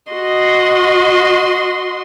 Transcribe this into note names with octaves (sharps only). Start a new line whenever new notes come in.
F#4 D#5 C6